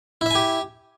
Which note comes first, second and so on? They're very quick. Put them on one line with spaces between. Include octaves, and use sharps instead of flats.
E4 E5 G#5 G4